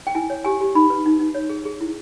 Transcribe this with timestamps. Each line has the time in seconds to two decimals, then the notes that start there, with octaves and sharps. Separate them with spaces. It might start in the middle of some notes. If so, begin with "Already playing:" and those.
0.07 G5
0.15 E4 G#5
0.30 C#5
0.44 G4 G#5
0.61 G4
0.75 D#4 B5
0.90 B4
1.06 D#4
1.19 D#4
1.35 C#5
1.49 G#4
1.65 G#4
1.81 E4